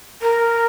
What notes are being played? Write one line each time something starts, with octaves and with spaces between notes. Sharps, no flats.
A#4